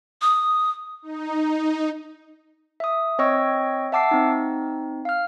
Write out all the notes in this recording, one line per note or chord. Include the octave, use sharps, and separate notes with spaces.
D#6
D#4
E5 D#6
C4 C#5 D#5 G5 C#6 E6
E5 F#5 A5 D6 E6 C7
C4 D#4
F5 F6